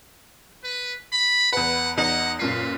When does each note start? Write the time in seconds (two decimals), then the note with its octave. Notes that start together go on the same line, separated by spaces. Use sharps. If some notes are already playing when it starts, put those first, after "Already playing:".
0.64 B4
1.12 B5
1.53 E2 B4 F#5
1.97 E2 D#4 F#5 C#7
2.39 F#2 A#2 B4 C7